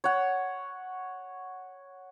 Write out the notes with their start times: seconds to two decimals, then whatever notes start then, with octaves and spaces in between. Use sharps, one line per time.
0.04 C#5 F#5